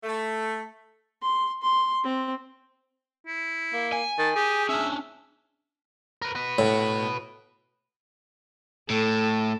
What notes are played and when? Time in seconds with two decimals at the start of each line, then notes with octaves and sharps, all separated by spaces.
0.04 A3
1.22 C6
1.62 C6
2.04 C4
3.27 E4
3.73 A#3
3.92 G#5
4.18 D#3 A5
4.36 G4 G#4
4.69 C#4 D4 E5
6.22 A#4 B4
6.35 F#4 B4
6.58 A2
8.90 A2 A4